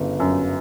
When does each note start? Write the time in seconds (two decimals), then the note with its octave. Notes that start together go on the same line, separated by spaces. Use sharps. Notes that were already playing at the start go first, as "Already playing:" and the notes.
Already playing: G1 C#3
0.20 F#2